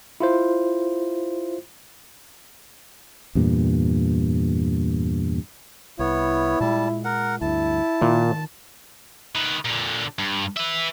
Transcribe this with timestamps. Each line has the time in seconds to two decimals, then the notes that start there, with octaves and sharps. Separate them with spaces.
0.20 E4 F4 C5
3.35 E2 G2 A#2
5.99 C2 B3 E4 C#5
6.60 A#2 G3 G#3 A5
7.05 A#4 F#5
7.41 D2 G2 E4 A5
8.01 A#2 D#3
9.35 D#3 B4
9.65 A#2 D3
10.19 G2
10.56 B4 E5